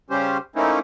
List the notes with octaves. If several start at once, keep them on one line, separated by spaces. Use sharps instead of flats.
C#3 G3 C#4 G4 C5
A3 A#3 C4 C#4 D#4 E4